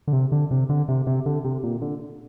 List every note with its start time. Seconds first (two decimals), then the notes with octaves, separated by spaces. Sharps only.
0.08 D3
0.13 C3
0.32 D3
0.51 C3
0.69 D3
0.88 C3
1.07 C3
1.26 D3
1.44 C3
1.63 A#2
1.82 D3